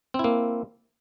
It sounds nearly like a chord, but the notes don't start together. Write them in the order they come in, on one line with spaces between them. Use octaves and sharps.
C4 E4 A#3